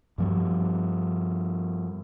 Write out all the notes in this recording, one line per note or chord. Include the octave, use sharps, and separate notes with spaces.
G2 F3 G3